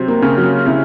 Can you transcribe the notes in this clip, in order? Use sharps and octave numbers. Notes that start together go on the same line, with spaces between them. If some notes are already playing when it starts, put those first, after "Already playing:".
Already playing: C3 F#3 C4
A#3
C#3 C#4
F#3
C#3 C#4 E4